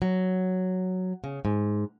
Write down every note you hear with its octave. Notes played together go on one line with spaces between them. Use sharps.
F#3
C#3
G#2